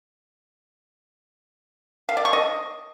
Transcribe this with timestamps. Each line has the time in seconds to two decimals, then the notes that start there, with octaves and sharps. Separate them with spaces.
2.09 F5
2.17 D5
2.25 C#6
2.33 D#5